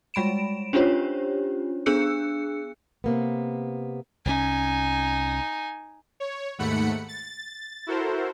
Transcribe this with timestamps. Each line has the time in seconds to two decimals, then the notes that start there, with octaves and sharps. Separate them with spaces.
0.14 G3 G#3 B5 D7 E7
0.73 C#4 D4 F4 G4 C5 C#5
1.86 B3 D4 G#4 E6 F#6 C#7
3.04 C3 A#3 B3
4.25 C2 F3 C#4 D#4 G#5
6.20 C#5
6.58 D#2 G#2 A3 F#5 B5 C#7
7.08 A6
7.87 E4 F#4 A4 A#4 C5